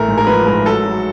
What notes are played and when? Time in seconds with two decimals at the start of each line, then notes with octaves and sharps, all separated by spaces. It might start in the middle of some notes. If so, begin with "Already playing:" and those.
Already playing: A1 A3 A#4
0.08 G#2
0.18 A#4
0.27 F3 B4
0.46 G#2 A#4
0.66 F#3 A4
0.85 F#3